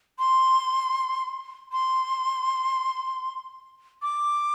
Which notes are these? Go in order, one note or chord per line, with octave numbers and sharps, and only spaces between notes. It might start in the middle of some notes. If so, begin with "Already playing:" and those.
C6
C6
D6